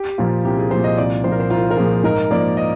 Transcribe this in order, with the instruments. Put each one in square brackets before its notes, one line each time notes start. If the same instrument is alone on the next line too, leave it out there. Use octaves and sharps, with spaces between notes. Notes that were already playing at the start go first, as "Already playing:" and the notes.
Already playing: [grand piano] G4
[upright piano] A#2 F3 [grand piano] F4
[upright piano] C2 [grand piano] G4
[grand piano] G#4
[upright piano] A#2 F3 [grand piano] C5
[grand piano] D#5
[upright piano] C2 [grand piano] D5
[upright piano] A#2 F3 [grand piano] C5
[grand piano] A#4
C5
[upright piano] C2 [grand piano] F4
[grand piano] A#4
[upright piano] A#2 F3 [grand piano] G#4
[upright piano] G#2 [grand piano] A#4
[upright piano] F3 A#3 [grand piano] D5
[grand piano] D#5